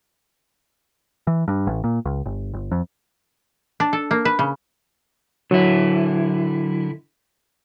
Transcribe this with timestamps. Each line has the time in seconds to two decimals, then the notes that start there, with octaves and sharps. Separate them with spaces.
1.27 E3
1.48 G2
1.67 A1
1.84 A#2
2.05 C#2
2.26 G1
2.54 G1
2.71 F2
3.80 D4
3.93 A4
4.11 A#3
4.25 B4
4.39 C#3
5.51 D3 F#3 E4